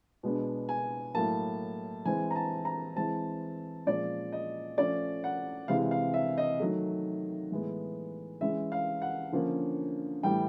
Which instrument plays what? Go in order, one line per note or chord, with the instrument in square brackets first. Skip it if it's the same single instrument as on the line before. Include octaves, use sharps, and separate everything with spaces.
[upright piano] B2 G#3 B3 D4
G#5
A2 F#3 A#3 A5
E3 G#3 C4 G#5
A#5
A5
A#5
E3 G#3 C4 A5
A#2 F3 G#3 C#4 D5
D#5
F3 A3 C#4 D5
F#5
C3 E3 G#3 F5
F5
E5
D#5
D#3 F#3 A3
A2 E3 G#3 B3
E3 G#3 C#4 E5
F5
F#5
D3 F3 A#3 C#4
A2 E3 G3 G5